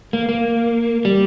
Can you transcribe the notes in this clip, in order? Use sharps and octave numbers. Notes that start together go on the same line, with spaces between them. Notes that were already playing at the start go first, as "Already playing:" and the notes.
A#3
A#3
G3